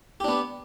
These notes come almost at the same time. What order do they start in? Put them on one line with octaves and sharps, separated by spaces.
G4 D4 B3